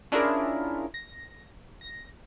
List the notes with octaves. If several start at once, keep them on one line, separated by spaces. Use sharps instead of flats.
C#4 D4 E4 F4 G#4 A#4
A#6
A#6